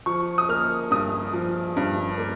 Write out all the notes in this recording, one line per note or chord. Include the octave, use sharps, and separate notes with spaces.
F3 C#6
D#6
A#3 F6
G2 D#6
F3
G2
A#3